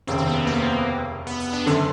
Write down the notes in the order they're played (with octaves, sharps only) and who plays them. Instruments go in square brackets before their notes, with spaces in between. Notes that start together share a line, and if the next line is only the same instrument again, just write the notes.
[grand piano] F1 D#2 C#3 [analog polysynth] C4
[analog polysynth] C4
B3
A#3
B3
B3
D4
[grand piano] F#1 F#2 D3 [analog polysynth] C#4